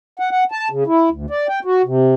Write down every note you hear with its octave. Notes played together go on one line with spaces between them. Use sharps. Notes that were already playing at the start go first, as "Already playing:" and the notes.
F#5
F#5
A5
C#3
E4
D2
D5
G5
F#4
C3